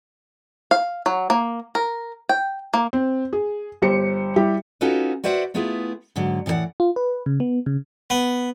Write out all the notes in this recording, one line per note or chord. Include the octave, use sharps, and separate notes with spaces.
F5
F#3
A#3
A#4
G5
A#3
C4
G#4
G1 G4 C5 C#7
G3 E4 G4
C#4 D#4 F4 F#4 A4 B4
F#4 B4 C5 D5 E5 F#5
A3 B3 E4 F4 G#4
G#2 D3 F#3
A2 E3 A#4 D5 F#5
F4
B4
C#3
B3
C#3
B3